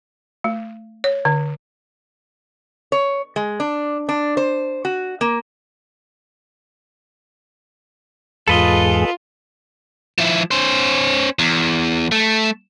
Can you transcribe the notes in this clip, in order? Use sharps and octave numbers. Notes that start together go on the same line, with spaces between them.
A3
C#5
D3
C#5
G#3
D4
D4
C5
F#4
A#3
E2 G#2 F4 G#4 A4 B4 D#5
F3 E4
C#4 C5
E2
A3